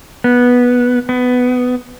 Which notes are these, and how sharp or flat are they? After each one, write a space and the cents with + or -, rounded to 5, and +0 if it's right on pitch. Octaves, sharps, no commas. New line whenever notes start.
B3 -10
B3 +10